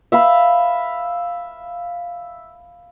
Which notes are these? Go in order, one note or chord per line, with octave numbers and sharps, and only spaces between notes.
E5 F5 B5